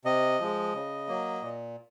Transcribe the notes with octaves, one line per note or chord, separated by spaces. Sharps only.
C3 D#5
F3 G#3
C#3
F#3 A#3
A#2